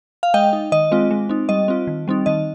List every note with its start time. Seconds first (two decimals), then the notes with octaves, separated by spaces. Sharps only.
0.23 F5
0.34 G#3 D#5 G5
0.53 D#4
0.72 D#3 D#5
0.91 G#3 C4 F4
1.11 G#3
1.29 C4 D#4
1.49 G3 D#5
1.68 C4 F4
1.87 D#3
2.08 G3 C4 D#4
2.26 D#3 D#5